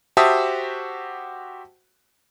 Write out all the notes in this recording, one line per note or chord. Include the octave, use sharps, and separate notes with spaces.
F#4 G4 C5 E5 A5 D#6